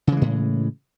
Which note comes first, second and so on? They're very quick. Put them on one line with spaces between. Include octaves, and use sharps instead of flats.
C#3 E3 G#3 A2